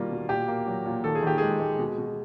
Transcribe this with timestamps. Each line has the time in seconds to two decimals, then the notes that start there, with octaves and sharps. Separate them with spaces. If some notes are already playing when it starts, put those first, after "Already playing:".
Already playing: B2 D#3 G3 A#3 F4
0.11 B2
0.29 A#2 G4
0.48 A#3
0.67 F#3
0.86 A#2
1.04 D#3 A4
1.15 G#4
1.22 D#3 G4
1.38 G#3 G#4
1.60 G#3
1.79 B2
1.98 B2